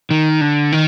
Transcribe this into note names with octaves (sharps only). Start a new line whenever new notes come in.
D#3
D3
D#3